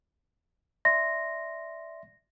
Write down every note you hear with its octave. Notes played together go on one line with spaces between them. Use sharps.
D5 E5 C6 A#6